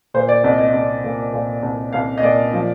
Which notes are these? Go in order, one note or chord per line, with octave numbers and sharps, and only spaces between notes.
A#2 C5
D5
C2 D#5
D#5
C2
A#2
A#2
C2
C2 F5
D#5
A#2 D5
F3